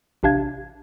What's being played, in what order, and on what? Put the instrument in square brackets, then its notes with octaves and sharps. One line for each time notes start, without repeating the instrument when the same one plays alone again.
[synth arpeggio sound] A1 C3 D4 F5 G#6